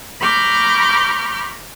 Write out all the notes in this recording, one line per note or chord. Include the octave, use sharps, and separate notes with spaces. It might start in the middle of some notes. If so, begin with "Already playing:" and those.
A#5 B5 C#6 D6 F6 G6